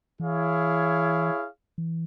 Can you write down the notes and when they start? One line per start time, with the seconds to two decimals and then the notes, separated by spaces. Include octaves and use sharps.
0.20 E3 E4 G#4 C#5 F5
1.78 E3